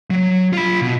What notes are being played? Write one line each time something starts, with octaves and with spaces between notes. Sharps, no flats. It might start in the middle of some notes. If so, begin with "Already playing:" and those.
F#3
F4 B5
B2